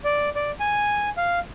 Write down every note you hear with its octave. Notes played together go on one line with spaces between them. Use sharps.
D5
D5
G#5
F5